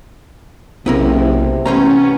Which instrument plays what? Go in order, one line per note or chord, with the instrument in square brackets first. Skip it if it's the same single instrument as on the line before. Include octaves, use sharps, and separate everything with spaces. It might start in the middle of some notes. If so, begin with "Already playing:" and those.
[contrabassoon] F#1 [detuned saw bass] B1 [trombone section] C3 [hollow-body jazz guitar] B3 E4 A#4
[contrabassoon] A1 [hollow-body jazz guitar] B3 C5 A#5 [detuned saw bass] C#4